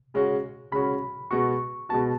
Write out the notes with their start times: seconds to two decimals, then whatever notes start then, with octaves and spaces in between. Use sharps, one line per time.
0.14 C#3 G#3 C#4 F#4
0.72 C#3 G#3 C#4 F#4 B5
1.31 B2 G#3 B3 F#4 C#6
1.89 B2 G#3 B3 F#4 A5